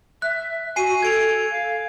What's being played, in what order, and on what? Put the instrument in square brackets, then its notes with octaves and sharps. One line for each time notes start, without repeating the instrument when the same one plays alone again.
[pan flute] E5 [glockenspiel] F#6
[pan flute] F#4 [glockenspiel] G#5 C7 D#7
[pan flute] A4 [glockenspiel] G#6 D7 F7
[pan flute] F5